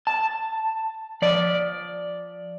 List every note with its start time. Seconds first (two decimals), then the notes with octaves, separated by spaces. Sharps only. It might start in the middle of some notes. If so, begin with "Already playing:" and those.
0.07 A5
1.22 F3 D5